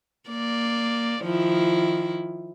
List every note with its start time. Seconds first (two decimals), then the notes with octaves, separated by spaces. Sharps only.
0.29 A#3 D5
1.22 D#3 F3 E4